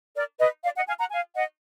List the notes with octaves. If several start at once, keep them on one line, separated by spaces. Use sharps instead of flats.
A#4 D5
B4 D#5
D5 F5
D#5 F#5
F5 G#5
F#5 A#5
F5 G#5
D#5 F#5